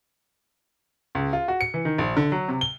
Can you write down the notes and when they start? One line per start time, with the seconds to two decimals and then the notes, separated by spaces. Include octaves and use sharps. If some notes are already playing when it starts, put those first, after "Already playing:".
1.15 C#2
1.33 F4
1.48 F#4
1.61 C#7
1.74 E3
1.85 D#3
1.98 A#1
2.17 D3
2.32 F#3
2.48 C3
2.61 G7